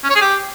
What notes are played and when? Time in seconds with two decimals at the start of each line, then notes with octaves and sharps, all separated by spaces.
0.04 C#4
0.09 C#5
0.15 G#4
0.21 G4